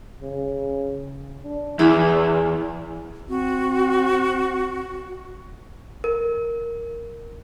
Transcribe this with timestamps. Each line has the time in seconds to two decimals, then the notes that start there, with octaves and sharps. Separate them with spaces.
0.22 C#3
1.44 D4
1.79 E2 E4 G#4
3.29 C4 F#4
6.04 A#4